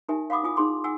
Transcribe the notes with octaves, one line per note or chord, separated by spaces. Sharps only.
D#4 G4 A#4 E5 G#5
F5 F#5 B5 D6 D#6
E4 F4 G#5 D#6
D#4 G#4 C6 D6
F#5 G#5 E6